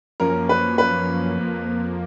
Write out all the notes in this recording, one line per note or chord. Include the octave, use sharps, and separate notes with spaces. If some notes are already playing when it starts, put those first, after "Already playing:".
F#2 F3 A#3 C#4 A#4
B4
B4
F2 F3 A#3